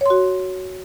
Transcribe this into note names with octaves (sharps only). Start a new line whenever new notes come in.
F#4 C#5 C6